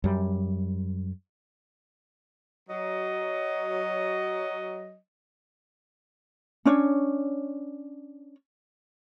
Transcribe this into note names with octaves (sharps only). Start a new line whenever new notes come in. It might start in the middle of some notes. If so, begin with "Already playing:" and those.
F#2 G3
F#3 D#5
C#4 D4 C#5